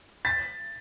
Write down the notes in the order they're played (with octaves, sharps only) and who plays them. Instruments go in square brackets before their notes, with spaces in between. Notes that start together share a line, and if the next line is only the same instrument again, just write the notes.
[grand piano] A6 B6